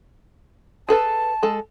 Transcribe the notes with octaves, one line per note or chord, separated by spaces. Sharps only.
G#4 A4 B4 A5
G#3 A4